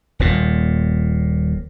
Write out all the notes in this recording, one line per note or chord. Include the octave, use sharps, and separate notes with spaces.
D#1 A#2